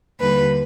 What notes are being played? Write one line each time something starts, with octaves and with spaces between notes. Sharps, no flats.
D#2 D3 G3 B4